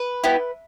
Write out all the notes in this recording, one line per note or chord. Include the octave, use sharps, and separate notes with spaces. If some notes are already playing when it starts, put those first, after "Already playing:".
Already playing: B4
B3 E4 G4